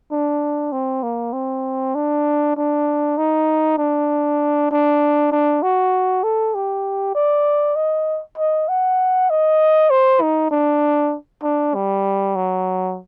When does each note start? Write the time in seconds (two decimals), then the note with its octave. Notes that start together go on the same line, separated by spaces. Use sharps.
0.12 D4
0.72 C4
1.03 A#3
1.33 C4
1.95 D4
2.57 D4
3.17 D#4
3.78 D4
4.71 D4
5.32 D4
5.63 F#4
6.23 A4
6.55 G4
7.15 D5
7.76 D#5
8.38 D#5
8.68 F#5
9.30 D#5
9.90 C5
10.22 D#4
10.51 D4
11.43 D4
11.75 G3
12.36 F#3